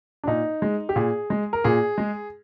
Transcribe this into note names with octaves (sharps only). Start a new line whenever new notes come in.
D4
A#2 D#4
G#3
G4
A#2 G#4
G#3
A#4
A#2 G#4
G#3